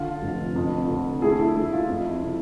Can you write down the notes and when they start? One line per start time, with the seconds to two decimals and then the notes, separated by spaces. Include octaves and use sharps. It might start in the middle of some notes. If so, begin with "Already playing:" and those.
Already playing: D3 F4
0.22 F1
0.56 F2
0.88 D3
1.22 A3 E4 G#4
1.40 E4
1.56 A3 E4
1.73 F4
1.89 F2 E4
2.23 C3